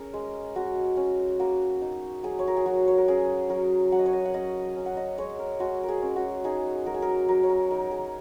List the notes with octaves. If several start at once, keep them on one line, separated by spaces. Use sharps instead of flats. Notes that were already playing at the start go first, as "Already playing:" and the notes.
Already playing: C#4 G#4 A#4 C#5
G#3
G#3 F#4
C#4
A#3 F#4
D#4
F#3 G#4
C#5
A#4
G#4
F#3 F#4
C#5
A#4
C#4 G#4
F#3 A#4
F#3 F#5
D#5
C#5
D#5
F#5
C#4 D#5
C#4
F#5
D#5
G#3 C#5
A#4
G#3 F#4
A#4
G#4
C#4
F#4
D#4 G#4
F#3 A#4
G#4
A#4
F#3 A#4
C#5
A#4
D#4 A#4
G#4